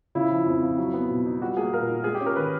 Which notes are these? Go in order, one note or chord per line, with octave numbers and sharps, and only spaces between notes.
C#3 E4
F3
F2
F2
F#3
B3
B2
D#4
G3 F#4
A#3 G#4
A#2 A#4
D#4
G#3 G#4
G4
C#4
A#4
D#3 B4